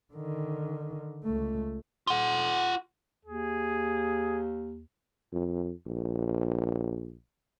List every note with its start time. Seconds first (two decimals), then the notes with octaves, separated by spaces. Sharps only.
0.14 D3 D#3
1.24 C#2 A3
2.07 F4 F#5
3.25 D#2 G#4
5.32 F2
5.86 A#1